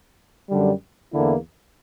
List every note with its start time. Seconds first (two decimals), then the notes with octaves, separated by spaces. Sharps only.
0.50 F#2 D3 G3
1.13 E2 D3 A#3 E4